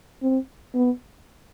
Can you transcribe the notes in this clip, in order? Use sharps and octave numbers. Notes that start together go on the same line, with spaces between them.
C4
B3